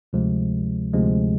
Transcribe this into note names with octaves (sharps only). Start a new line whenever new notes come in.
D2 C3 F3 G#3
D2 C3 F3 G#3